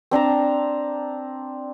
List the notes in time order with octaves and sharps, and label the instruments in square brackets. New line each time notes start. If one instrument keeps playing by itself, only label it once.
[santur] C4 D4 A5 A#5